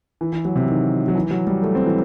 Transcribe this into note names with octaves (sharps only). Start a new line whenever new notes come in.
E3
E3
F#3
C3
D#3
F#3
E3
F#3
G3
A3
C4
E3